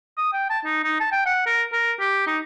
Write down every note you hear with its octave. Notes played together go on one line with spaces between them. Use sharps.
D#6
G5
A5
D#4
D#4
A5
G5
F#5
A#4
A#4
G4
D#4